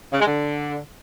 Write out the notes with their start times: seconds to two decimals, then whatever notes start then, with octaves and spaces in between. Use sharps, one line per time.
0.12 C#3
0.19 G#3
0.26 D3